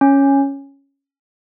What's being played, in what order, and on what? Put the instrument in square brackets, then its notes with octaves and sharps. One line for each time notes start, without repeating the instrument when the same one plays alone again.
[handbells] C#4